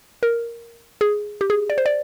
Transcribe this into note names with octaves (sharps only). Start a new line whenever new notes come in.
A#4
G#4
G4
G#4
D5
C5
D5